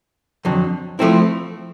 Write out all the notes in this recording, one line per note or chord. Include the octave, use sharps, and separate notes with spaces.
F2 D3 F#3
F3 A3 C4 E4